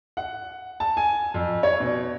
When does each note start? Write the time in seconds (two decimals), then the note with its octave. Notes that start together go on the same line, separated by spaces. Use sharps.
0.17 F#5
0.80 A5
0.97 G#5
1.34 F2
1.63 C#5
1.80 B2